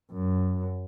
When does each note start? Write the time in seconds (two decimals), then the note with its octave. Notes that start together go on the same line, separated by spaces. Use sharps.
0.12 F#2